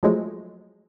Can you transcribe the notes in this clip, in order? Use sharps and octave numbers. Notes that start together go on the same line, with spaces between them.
F3 F#3 G#3 A3